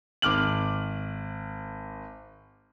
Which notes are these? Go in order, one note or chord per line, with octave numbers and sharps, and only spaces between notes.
G#1 D6 F6 F#7